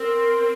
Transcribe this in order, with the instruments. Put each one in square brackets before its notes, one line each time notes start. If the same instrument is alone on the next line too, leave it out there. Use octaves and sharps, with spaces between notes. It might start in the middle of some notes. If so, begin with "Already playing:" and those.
Already playing: [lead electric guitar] C4 [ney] A#4